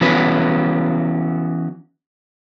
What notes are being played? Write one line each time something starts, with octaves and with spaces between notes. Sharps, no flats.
E3 B3 C#4 F#4 B4